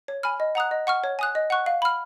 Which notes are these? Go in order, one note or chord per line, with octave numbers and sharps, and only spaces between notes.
C#5
G#5 B5 F6
D#5
F#5 A#5 D#6 F#6
D#5
F#5 C#6 F6
C#5
G#5 D#6 F#6
D#5
F#5 C#6 F#6
F5
B5 F6